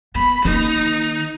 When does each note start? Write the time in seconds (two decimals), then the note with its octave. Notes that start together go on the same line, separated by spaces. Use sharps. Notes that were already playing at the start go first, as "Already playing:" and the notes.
0.15 B3 B5
0.45 D#3 A#3 D#4